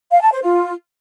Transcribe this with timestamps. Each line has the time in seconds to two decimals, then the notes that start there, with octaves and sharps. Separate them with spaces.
0.11 F5
0.21 A5
0.32 C5
0.42 F4